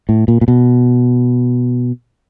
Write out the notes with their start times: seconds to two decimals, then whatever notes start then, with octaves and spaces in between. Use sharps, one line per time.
0.09 A2
0.28 A#2
0.41 A#2
0.48 B2